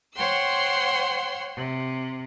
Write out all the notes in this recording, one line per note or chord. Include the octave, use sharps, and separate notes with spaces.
C5 C#5 F#5 G5 C6 E6
C3